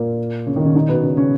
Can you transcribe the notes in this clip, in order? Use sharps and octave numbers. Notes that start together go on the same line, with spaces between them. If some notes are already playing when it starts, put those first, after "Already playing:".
Already playing: A#2 A#3
C#3 C#4
D#3 D#4
C#3 C#4
D#3 D#4
B2 B3
C#3 C#4
C#3 C#4